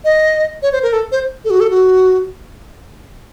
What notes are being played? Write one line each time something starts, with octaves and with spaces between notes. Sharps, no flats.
D#5
C#5
C5
A#4
A4
C5
A4
F#4
A4
F#4